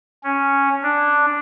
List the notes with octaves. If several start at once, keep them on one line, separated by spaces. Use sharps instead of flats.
C#4
D4